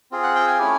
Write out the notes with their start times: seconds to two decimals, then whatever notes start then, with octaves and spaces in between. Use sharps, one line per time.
0.12 C4 F4 G#4
0.23 F#5
0.35 G5
0.47 G#5
0.58 A3 C#4 E4 G4